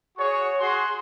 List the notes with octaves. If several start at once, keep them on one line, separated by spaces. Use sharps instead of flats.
F#4 G#4 C#5 C#6
F#4 G#4 C6